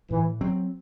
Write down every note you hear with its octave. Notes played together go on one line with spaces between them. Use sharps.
A2 E3
F#3 C4